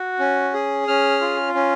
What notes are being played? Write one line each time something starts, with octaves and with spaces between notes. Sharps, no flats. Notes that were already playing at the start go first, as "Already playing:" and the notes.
Already playing: F#4
C#4
G#4
C#4 F6
F4
C#4